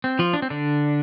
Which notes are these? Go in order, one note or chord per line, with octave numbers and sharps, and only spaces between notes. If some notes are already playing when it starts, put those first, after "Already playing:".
C4
F3 F4
D4
C4
D3 D4